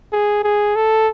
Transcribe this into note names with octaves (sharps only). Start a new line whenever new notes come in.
G#4
G#4
A4